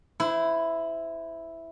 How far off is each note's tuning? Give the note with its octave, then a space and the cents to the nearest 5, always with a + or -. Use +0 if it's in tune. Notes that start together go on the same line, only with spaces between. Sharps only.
E4 +0 C5 -35